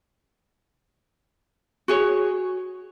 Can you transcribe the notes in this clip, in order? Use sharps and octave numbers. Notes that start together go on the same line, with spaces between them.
F#4 G#4 C#5